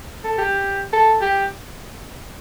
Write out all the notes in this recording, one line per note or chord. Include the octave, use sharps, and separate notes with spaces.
A4
G4
A4
G4